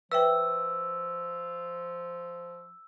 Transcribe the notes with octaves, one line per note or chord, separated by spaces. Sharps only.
F3 B4 E5 G5 E6